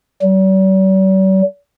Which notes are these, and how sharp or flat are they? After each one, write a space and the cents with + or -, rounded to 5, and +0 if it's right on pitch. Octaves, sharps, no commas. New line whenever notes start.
G3 -45